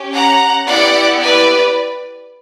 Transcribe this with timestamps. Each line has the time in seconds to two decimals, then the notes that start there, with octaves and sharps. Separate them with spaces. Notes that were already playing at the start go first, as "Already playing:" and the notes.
Already playing: C#4 G4
0.13 F#5 A#5
0.67 B3 E4 G4 D5 F#5
1.22 B4 D5